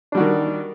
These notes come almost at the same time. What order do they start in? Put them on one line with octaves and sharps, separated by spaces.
D4 G3 F#4 D#3